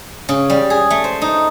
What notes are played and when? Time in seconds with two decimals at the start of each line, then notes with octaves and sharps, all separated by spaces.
0.29 C#3
0.50 G3
0.70 G#4
0.91 A3
1.04 C5
1.22 D#4